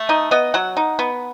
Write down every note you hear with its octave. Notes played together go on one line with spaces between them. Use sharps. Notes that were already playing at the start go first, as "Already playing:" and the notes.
Already playing: A3
D#4 D#5
B3 D#5
F#3 F#5
D#4
B3